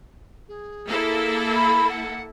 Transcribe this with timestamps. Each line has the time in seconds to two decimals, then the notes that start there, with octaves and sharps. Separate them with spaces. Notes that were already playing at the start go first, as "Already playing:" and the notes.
0.49 G#4
0.87 A#3 E4 A4
1.54 B5
1.90 F#5